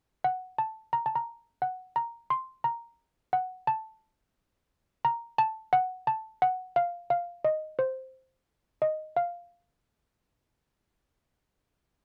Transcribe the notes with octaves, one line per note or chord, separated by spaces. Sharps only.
F#5
A5
A#5
A5
A#5
F#5
A#5
C6
A#5
F#5
A5
A#5
A5
F#5
A5
F#5
F5
F5
D#5
C5
D#5
F5